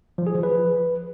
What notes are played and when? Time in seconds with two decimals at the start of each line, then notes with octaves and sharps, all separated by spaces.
0.18 F3
0.27 G#4
0.35 F3
0.43 B4